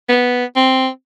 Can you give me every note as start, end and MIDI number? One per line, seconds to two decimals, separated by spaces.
0.09 0.45 59
0.56 0.88 60